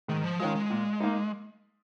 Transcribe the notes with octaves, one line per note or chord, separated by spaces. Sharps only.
G#2 D#3
F3
D#3 G#3 C#4 F4
G#3
A#2
A#3 D#4